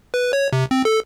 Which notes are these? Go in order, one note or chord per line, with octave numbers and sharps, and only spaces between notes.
B4
C#5
C3
C4
A4